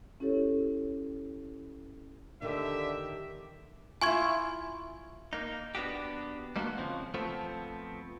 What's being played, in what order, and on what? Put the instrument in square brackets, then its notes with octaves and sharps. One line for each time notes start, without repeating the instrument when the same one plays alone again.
[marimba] C#4 E4 G4 A4 C#5
[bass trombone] D3 [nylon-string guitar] D#3 [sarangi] G4 [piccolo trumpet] E5
[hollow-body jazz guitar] E4 F4 [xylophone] G#5 C#6 G#6
[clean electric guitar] A#3 D#4
B3 D4 F#4 G4
G3 G#3 A#3 B3 D4 F#4
C#3 F3 C4
F3 A3 B3 C4